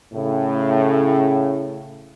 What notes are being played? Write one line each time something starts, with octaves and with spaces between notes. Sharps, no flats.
A2 C#3